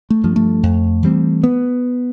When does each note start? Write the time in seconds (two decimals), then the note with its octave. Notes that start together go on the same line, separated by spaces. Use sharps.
0.10 A3
0.24 G2 F3
0.36 A3
0.63 F2
1.03 E3 G3 C4
1.43 B3